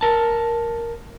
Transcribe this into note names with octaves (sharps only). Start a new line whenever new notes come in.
A#4 A5